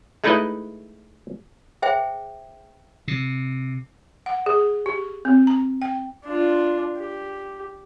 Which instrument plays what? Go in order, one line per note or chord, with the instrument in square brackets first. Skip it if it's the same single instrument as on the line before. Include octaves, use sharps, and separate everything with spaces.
[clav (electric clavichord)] G#3 A3 D#4 E4 B4 D#5
[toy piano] G#4 C5 E5 G5
[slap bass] C3
[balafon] F#5
G#4
G4
C4
A#5
G5
[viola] D4 F4
G4